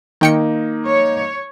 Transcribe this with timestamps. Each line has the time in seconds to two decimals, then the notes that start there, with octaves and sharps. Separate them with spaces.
0.21 D#3 A#3 D#4 G5 C#7
0.87 C#5